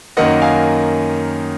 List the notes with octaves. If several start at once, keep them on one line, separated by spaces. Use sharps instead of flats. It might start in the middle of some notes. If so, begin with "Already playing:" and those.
F#2 D#3 A#3 D#5 F#5
F5 G#5